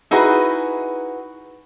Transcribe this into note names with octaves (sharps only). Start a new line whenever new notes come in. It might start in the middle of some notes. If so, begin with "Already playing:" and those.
D#4 E4 F#4 G#4 B4